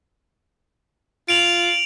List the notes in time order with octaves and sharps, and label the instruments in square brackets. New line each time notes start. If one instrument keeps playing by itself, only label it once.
[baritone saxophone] F4 [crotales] D7 F7 F#7